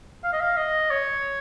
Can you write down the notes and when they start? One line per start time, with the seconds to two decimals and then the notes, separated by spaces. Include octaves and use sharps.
0.24 F5
0.33 D#5
0.40 F5
0.57 D#5
0.90 C#5